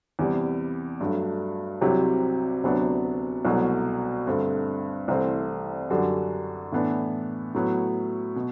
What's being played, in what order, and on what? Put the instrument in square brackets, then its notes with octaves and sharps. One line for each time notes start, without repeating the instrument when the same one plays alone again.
[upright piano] E2 C3 G3
G2 F#3 A3
C2 C3 F#3 C4 G4
D2 C3 F#3 B3 D4
C2 B2 F#3 A3
G2 D3 A3 C4
C2 C3 E3 A3 C4
F#2 D3 G3 D4 F#4
A2 E3 B3 D4
A2 F#3 B3
B2